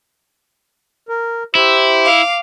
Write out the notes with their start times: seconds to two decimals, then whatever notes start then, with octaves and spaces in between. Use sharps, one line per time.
1.09 A#4
1.55 E4 G4 C5 E5
2.05 F5 D6